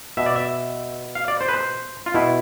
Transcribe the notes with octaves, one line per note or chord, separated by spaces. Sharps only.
B2 E5
D5
E5
F5
D5
C5
B4
C5
F4
B2 E4